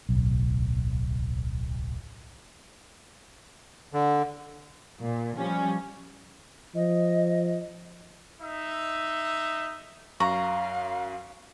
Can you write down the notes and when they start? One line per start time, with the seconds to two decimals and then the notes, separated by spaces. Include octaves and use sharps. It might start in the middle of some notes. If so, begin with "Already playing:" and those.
0.09 D1 B1
3.93 D3
5.00 A#2
5.37 F3 G3 C#4
6.75 F3 D#5
8.42 D#4 E5
10.20 F#2 F5 A#5 C#6